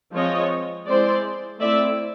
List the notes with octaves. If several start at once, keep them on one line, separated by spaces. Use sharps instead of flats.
F3 G#3 C4 F4 C#5 D#5
G#3 C4 E4 C5 D5
A3 C4 E4 D5 E5